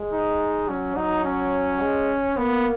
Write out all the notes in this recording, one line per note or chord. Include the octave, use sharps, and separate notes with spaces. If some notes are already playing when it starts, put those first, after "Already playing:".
Already playing: G#3
D#4
F#3 C#4
F#3 D#4
C#4
G#3
A#3 B3